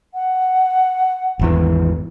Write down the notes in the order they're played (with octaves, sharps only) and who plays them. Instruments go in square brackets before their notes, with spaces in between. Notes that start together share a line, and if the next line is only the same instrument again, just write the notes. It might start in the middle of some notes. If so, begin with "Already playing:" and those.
[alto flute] F#5
[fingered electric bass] G#1 E2 E3